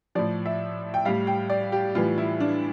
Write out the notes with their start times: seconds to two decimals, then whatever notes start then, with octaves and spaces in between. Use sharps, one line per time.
0.15 A2 F3 D5
0.46 E5
0.94 G5
1.05 A2 G3 F5
1.27 G5
1.50 D5
1.72 G4
1.95 A2 E3 G3 F4
2.18 E4
2.40 D4